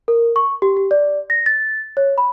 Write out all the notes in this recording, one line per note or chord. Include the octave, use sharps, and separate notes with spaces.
A#4
C#6
G4
G4
D5
A#6
A6
C#5
B5